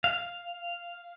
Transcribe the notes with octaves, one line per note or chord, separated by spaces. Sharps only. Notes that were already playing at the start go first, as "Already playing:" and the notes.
F5